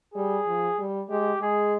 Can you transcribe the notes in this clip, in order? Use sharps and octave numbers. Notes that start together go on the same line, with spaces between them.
G3 G#4
F3
G3
G#3 G4
G#3 G#4